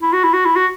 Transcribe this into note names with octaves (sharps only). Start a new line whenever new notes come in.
E4
F#4
E4
F#4
E4
F#4